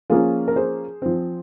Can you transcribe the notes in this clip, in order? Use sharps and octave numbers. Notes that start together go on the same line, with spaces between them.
F3 A#3 C#4 F4 G#4
A#4
G#4 C5
F3 C4